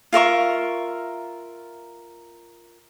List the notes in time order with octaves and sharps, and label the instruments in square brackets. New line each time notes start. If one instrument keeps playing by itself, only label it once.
[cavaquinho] F4 A#4 E5 C#6